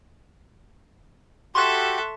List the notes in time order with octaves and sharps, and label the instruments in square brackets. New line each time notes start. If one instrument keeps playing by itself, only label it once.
[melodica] F#4 G4 [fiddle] A4 E5 [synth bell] C6 C#6 F#6